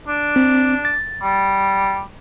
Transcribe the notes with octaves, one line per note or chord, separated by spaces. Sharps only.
D4
C4
A6
G3